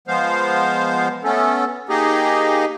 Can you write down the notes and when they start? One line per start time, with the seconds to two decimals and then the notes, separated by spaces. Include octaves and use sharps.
0.08 F3 G#3 B3 C5 F5
1.24 A3 B3 C#4 A4
1.89 A#3 D#4 G4 G#4 D#5